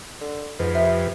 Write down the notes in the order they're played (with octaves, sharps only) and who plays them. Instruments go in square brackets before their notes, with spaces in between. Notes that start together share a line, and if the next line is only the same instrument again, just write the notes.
[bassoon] D3
[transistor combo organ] F2 [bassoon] G#2 [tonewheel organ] B4
[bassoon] C3 [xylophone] E5